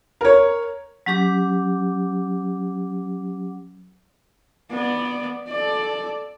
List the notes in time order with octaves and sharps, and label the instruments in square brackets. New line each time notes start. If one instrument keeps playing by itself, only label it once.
[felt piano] A#4 C#5
[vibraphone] F#3 C#4 G4 D6
[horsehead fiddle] B3 D5
A4 D5